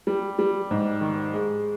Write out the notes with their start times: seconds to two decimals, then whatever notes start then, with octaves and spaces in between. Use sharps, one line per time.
0.07 G3
0.39 G3
0.71 G#2
1.01 D#3
1.34 G#3